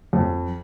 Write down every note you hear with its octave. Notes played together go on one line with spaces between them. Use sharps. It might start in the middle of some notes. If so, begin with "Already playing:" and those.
F2